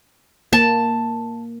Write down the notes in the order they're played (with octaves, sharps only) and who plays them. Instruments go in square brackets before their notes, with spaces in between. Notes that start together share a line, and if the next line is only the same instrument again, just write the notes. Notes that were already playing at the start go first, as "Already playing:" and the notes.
[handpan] A#3 [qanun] A5